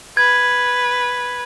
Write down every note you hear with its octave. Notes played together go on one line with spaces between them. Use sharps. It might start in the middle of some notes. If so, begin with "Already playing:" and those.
B4 G#6